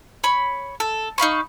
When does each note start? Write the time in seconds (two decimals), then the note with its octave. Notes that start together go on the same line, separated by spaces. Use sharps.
0.24 C#5 B5
0.80 A4
1.18 D#4 F5 B5 C#6